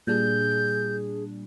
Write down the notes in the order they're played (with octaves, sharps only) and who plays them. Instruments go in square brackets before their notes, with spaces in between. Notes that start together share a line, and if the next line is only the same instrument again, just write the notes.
[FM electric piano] A#2 G3 D4 [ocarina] G#4 [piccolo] G6